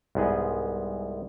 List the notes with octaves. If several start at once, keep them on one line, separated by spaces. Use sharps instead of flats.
C2 G#2 B3 G#4 D#5